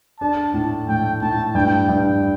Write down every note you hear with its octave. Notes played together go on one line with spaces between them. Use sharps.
D4 A5
A2
A2 G5
A2 A5
G2 G5
G2